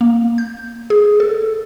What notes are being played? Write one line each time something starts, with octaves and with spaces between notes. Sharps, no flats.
A#3
G6
G#4
A4